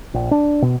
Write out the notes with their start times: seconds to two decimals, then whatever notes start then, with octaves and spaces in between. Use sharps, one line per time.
0.14 A#1
0.31 D4
0.62 B2